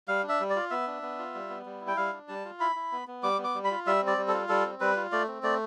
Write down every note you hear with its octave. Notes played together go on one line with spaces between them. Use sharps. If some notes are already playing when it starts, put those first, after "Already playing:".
G3 F5
D4
E5
G3
D5
F4
B3 E5
D4
B3
F4
G3
B3
G3
E4
G5
G3 F5
D4
G3 A5
F4
E4 B5
E4
B3
B3
G3 D6
B3
D6
G3
B5
F4
G3 E5
C4 D5
G3
A4
F4
G3 A4
C4
G3 B4
F4
A3 D5
C4
A3 D5